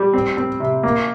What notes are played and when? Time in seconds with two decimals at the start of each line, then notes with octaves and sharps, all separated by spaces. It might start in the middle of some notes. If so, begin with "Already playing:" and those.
Already playing: G3
0.13 C4
0.37 C4
0.60 C3
0.83 A#3